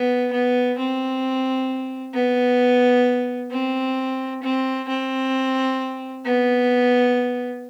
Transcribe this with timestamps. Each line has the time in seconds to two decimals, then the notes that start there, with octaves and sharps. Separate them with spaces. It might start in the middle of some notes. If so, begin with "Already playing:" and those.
Already playing: B3
0.33 B3
0.78 C4
2.14 B3
3.51 C4
4.43 C4
4.88 C4
6.25 B3